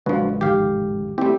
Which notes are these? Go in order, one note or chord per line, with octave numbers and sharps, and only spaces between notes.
A1 C#3 F3 F#3 G#3 D4 F#4 B4
F2 G#2 D#3 G4 F5
G3 A3 A#3 C4 E4 G4